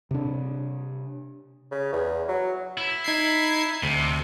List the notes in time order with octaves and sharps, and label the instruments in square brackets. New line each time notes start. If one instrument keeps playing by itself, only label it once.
[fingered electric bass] C3 D4
[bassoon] C#3
E2
F#3
[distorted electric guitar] E4
[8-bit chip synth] D#4 G#6 C7
[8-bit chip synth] D2 [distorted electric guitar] C3